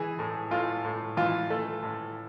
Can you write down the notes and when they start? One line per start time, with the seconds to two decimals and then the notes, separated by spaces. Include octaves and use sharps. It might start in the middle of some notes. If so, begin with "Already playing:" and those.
Already playing: E3 G#4
0.19 A2
0.51 A2 F4
0.85 A2
1.17 E3 F4
1.50 A3
1.82 A2